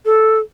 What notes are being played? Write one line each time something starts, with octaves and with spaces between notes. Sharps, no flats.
A4